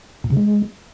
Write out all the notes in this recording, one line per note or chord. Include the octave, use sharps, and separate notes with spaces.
A#2
C#3
G#3